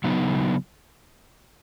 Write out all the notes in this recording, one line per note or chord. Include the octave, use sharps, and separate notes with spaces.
C#3 F#3 B3 D#4